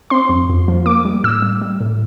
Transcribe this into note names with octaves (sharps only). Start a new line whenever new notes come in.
C4 C6
F2
F2
F3
A#3 D6
G3
A2 E6
G3
G3
A2